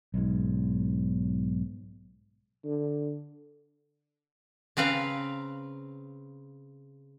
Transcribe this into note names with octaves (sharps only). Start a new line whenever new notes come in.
B1 G#2
D3
C#3 C4 B4 F5 A#5